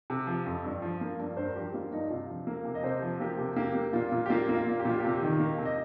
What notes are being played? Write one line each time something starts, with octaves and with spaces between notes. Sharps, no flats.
C3
F3
F2
G2
F3
A#3
G2
G2 C5
A#4
F3 G4
A#3 F4
G2 D#4
C3 F4
F3
A#3
C3
D#5
C3 C5
F3
A#3 G4
C3
A#3 G4
A#3
A#2 F4
A#2
G4
A#3 F4
A#3
F4
A#2
G4
A#2 F4
C3 G4
D#3
A#3
C3
D#5